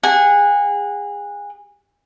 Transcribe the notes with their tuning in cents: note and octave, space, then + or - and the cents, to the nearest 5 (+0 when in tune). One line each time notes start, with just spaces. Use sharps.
G#4 -25 F#5 -10